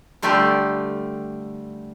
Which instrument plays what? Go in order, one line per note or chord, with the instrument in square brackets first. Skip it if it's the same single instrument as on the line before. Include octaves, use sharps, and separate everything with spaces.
[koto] D3 G3 A3 F4 G4